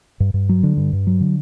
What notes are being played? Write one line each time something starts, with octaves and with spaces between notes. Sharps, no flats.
G2
G2
F#3
D3
G2
G2
F#3
D3